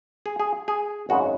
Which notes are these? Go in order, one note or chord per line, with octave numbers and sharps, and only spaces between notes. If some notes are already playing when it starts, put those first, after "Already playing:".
G#4
G#4
G#4
G#1 F#2 C#3 G#3 C#4 F#4